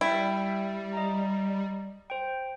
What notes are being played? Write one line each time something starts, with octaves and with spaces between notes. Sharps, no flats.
G3 E4 G5
D#5 A#5
C5 G5